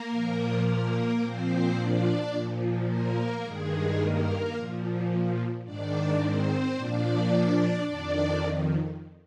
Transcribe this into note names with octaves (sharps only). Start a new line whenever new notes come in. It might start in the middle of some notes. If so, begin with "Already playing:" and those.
Already playing: A#3 A#4
A#2 F3
A#3 A#4
A#2 F3 C4 C5
D4 D5
A#2 F3
A#3 A#4
G2 D#3 G#3 G#4
A#3 A#4
A#2 F3
G#2 D#3 D4 D5
C4 C5
A#2 F3 D4 D5
F2 D#3 D4 D5